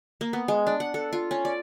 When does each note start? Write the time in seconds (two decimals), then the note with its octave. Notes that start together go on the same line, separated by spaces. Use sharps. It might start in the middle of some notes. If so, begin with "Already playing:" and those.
0.21 A#3
0.33 B3
0.48 G#3
0.67 D4
0.80 F#5
0.94 A4
1.13 F4
1.31 C#4
1.45 D5